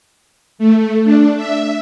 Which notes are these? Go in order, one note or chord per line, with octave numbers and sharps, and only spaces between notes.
A3
D4
E5